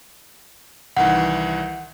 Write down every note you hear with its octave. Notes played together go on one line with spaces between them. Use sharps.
C2 D#3 E3 F#5